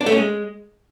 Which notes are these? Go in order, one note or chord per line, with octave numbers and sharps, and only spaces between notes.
D4
A3
C#4
G#3